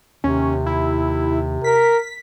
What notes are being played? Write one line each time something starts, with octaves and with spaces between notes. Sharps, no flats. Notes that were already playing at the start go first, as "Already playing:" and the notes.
D#2 C3 C#4
E4
A#4 B6